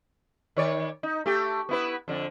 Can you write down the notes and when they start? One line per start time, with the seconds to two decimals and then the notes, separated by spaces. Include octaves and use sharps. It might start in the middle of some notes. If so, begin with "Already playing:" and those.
0.56 D#3 C#5 D5
1.03 D#4
1.26 A3 G4
1.69 B3 E4 B4
2.08 F2 D3